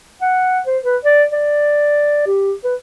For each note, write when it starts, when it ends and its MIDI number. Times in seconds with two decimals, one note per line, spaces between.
0.21 0.59 78
0.66 0.78 72
0.84 0.97 71
1.05 1.24 74
1.32 2.22 74
2.26 2.52 67
2.64 2.75 71